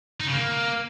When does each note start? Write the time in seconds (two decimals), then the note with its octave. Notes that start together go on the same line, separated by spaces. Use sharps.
0.20 D#4
0.27 C#3
0.33 A#3